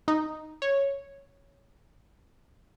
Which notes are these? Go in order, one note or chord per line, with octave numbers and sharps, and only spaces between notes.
D#4
C#5